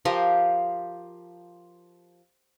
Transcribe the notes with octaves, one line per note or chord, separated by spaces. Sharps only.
F3 F4 G4 A#4